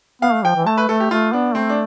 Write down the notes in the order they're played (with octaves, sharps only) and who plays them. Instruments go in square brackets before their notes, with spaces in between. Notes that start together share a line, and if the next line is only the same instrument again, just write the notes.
[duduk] B3 [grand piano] F5
[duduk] A3
[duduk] F3 [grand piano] G5
[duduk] E3
[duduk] A3 [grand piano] A5
[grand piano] B4
[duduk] A3 [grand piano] A4
[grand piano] G4
[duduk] A3 [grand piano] F4
[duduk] B3 [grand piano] D4
[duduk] A3 [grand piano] C4
[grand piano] D4